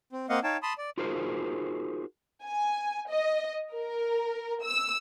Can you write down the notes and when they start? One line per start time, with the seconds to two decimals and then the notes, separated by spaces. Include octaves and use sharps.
0.13 C4
0.29 A#3 C4 D#5 F5 F#5
0.44 D#4 C#5 F5 G5 A5
0.63 A5 B5 C6 D#6
0.78 D5
0.98 D#4 F4 F#4 G#4 A#4 C5
2.43 G#5
3.09 D#5
3.73 A#4
4.62 E6